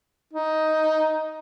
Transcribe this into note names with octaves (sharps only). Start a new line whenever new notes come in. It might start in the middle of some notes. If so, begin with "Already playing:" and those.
D#4